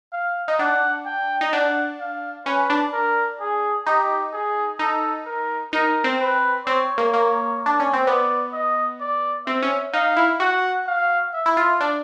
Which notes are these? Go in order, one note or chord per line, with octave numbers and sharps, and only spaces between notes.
F5
D#4
D4 F#5
G5
D#4
D4 F#5
F5
C#4 B4
D4
A#4
G#4
D#4 G4
G#4
D#4 A4
A#4
D#4 A#4
C4
B4
C4 C#5
A#3
A#3
D4
C#4
C4
B3 D5
D#5
D5
C4 E5
C#4
D#4 F5
E4
F#4 F#5
F5
E5
E4
F4
D4